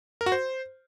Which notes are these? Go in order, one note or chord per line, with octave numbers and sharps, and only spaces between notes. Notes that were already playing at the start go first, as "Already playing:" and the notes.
A#4
F#4
C5